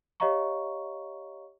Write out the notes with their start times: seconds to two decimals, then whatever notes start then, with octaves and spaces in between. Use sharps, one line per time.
0.20 G4 C#5 D#5 F5 A#5 C#6